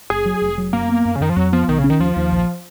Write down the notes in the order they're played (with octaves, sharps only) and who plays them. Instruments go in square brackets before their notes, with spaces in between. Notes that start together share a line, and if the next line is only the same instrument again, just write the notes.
[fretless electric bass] F#1 [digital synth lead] G#4
[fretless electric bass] F#3
F1
F#3
[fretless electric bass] F#2 [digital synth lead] A#3
[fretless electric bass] B3
F#2
[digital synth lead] C#3
[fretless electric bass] F#2 [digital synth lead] D#3
[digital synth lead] F3
[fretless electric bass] F2 [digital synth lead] F#3
[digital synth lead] F3 [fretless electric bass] B3
[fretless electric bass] B1 [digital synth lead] D#3
[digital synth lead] C#3
[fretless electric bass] C#4
[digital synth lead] D#3
[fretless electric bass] D#2 [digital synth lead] F3
[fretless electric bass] D#2
A#1